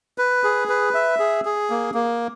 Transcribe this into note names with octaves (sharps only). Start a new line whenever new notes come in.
B4
G#4
B4
E5
G#4
G#4
A#3
A#3